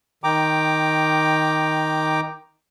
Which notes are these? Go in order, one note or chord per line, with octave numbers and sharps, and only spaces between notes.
D#3 G5 A#5 D6